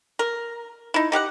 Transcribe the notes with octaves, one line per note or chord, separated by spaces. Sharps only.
A#4
D#4 E4
D#4 G4 F5 F#5